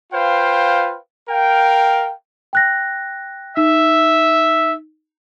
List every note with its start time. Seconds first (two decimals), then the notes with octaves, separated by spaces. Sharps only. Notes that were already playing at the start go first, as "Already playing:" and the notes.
0.13 F4 B4 C5 F5 G5
1.29 A#4 F5 G5
2.53 G5 F#6 A#6
3.57 D#4 E5